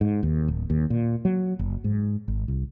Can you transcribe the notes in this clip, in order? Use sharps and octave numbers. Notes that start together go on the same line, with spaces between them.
G#2
D#2
D1
D#2
A#2
F#3
F#1
G#2
G#1
C2